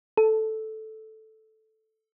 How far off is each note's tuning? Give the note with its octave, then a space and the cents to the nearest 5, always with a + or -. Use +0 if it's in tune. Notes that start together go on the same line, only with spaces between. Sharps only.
A4 -5